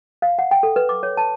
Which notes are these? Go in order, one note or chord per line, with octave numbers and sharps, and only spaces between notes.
F5
F#5
G5
A4
B4
D6
C#5
A5